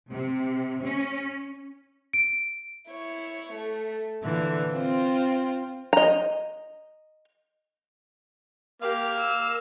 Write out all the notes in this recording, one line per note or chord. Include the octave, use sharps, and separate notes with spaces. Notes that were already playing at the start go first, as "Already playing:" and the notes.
C3
C#4
D7
E4 C#5
A3
A#2 D3 E3
C4 F4
D#5 A#5
A#3 G4 F5
E6